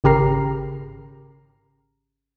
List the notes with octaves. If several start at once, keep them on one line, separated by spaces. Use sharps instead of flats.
G#1 C#3 G4 A#4 A#5 C7